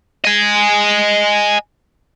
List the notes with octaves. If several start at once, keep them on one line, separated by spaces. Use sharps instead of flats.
D#5 G#5